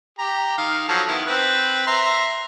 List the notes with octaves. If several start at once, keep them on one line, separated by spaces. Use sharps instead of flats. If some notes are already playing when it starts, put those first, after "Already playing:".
G4 A#5
D#3 F5
F3 F#3 A4
D#3 B3 E4
C4 B4
E5 A#5 C6